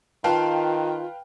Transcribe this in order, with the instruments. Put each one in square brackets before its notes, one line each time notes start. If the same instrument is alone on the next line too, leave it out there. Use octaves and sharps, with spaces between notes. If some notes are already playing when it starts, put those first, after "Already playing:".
[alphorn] D#3 [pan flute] F4 [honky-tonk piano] B4 F5 G5 [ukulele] A5